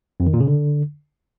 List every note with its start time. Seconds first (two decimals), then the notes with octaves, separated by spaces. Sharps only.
0.20 F2
0.27 D#3
0.34 A#2
0.40 C#3
0.47 D3